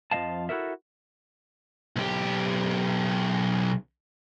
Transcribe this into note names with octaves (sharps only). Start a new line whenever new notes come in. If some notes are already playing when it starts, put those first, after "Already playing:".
F2 F3 G3 D#5 F5 A5
E4 F#4 G4 A4 A#4 E5
B1 G4